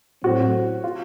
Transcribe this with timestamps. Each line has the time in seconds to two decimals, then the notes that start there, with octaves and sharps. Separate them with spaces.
0.24 A2 F#3 C4 F#4
0.84 F4